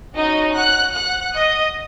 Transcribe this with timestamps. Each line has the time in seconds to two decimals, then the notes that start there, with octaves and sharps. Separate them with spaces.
0.16 C#4 D#4 F#4 D#5
0.55 F#5 F#6
0.94 F#5 F#6
1.34 D#5 D#6